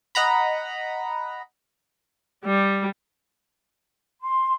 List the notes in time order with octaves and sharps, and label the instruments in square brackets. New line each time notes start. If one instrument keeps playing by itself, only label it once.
[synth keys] D#5 F#5 A#5 B5
[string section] G3
[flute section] C6